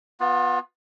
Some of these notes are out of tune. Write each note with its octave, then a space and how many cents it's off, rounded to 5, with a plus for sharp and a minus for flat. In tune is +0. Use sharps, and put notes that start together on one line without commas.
B3 +0 F4 +30